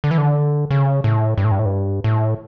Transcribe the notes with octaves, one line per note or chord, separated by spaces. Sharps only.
D3
E3
D3
C#3
A2
G2
A2
G2
A2
G2
A2